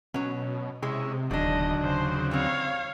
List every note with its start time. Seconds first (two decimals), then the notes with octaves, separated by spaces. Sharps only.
0.14 B2 F#3 C#4
0.82 C3 G#3 C#4 E4 G#4
1.31 E1 D#2 D3 F#3 D4 G#4 D#5
1.84 C#3 C5 C6
2.31 G3 C4 C#5 F5